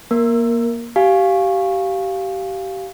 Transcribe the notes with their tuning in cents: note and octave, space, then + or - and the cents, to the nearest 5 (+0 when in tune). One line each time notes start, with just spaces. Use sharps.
A#3 +20 A#4 -5
G4 -25 F5 +0 G#5 +0